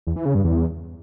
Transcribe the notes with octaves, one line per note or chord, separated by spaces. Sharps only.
E2
E3
C#3
G2
E2